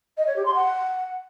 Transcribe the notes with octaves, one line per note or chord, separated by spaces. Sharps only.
D#5
C#5
G4
C6
F#5